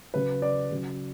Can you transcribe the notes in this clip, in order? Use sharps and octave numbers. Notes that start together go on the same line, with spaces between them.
C#3 F#3 B4
D5
C#3 F#3